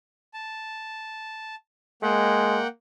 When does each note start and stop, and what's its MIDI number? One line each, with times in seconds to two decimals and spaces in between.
0.34 1.55 81
2.02 2.61 56
2.02 2.67 58
2.02 2.67 78
2.02 2.67 79